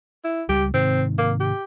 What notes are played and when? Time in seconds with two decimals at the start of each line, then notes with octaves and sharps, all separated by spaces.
0.24 E4
0.49 C#2 G3 G4
0.74 G#2 C3 D#3 C4
1.18 A#3
1.40 G4